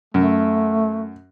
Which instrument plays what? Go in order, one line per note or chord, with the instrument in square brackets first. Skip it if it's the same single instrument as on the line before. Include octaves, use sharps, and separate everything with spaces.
[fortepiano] F#2 [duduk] A3